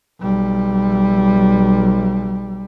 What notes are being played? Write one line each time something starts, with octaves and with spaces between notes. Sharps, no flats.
B1 G3